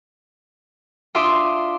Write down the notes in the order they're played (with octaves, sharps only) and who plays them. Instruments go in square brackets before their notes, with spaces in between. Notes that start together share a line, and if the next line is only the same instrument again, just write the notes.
[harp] D4 F4 E5 C6 D6 D#6